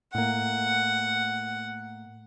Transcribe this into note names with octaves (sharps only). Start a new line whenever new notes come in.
A2 A#3 F#5